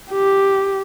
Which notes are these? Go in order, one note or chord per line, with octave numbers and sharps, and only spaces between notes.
G4